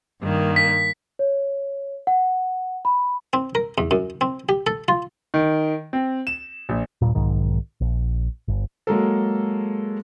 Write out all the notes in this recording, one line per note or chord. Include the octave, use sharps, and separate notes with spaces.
G2 D#3 A#3
B6
C#5
F#5
B5
C4
A#4
E2
F#2
C4
G4
A4
F4
D#3
C4
E7
A#1
D#1 G#1 G2 A#2
B1 G#2 D#3
A#1
G1
F#3 G#3 A#3 A4